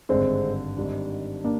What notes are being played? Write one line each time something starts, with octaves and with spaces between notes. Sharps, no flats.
G#1 G2 D3 G#3 C4
G#1 G#2 G3 D4
A#3 D4